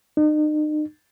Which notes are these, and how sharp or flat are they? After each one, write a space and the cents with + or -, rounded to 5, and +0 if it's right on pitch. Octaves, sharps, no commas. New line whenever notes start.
D#4 -40